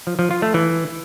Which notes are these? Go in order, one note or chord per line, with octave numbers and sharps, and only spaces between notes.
F3
F3
F4
A3
E3